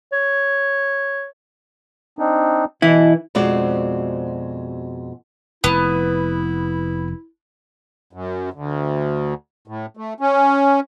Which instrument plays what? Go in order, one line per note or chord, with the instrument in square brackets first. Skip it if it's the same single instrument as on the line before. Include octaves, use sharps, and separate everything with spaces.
[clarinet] C#5
[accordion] C4 D4 D#4
[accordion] B2 [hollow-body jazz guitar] E3 E4
[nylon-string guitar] F2 B2 G#3 C4 F#4 D5
[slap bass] F1 [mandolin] B3 [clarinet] E4
[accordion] F#2
D2
A2
A3
C#4